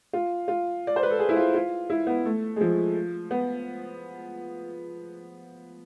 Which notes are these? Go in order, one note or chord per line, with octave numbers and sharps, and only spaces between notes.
F4
F4
D5
C5
B4
A4
G#4
E4
F4
F4
E4
B3
A3
G#3
F3
B3